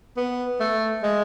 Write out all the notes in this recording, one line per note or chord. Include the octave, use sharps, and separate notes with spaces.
B3
A3
G#3